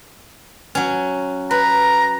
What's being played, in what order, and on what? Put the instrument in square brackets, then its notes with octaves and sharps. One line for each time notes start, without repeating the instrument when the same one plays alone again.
[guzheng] F#3 C#4
[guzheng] B4 [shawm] A#5